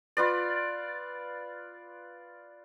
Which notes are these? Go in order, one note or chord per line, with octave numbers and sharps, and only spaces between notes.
F4 B4 D5